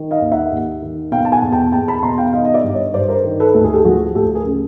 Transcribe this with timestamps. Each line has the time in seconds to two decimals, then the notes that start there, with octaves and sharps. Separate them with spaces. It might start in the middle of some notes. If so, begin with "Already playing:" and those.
Already playing: D#3
0.11 D#5 F5
0.21 D#2
0.32 E5 F#5
0.51 D#2
0.82 D#3
1.12 B2 F5 G5
1.25 A5
1.32 F#5 G#5
1.42 E2
1.52 G5 A5
1.72 E2 G5 A5
1.88 A5 B5
2.03 B2 A#5 C6
2.18 F5 G5
2.33 D#3 D#5 F5
2.45 D#5
2.54 D5 E5
2.63 G2
2.73 C#5 D#5
2.94 G2 C5 D5
3.09 A#4 C5
3.24 D#3
3.40 A4 B4
3.54 D2 A4
3.64 G#4
3.73 G4 A4
3.85 F3 F#4 G#4
4.15 D2 G4 A4
4.35 G#4 A#4
4.46 C#3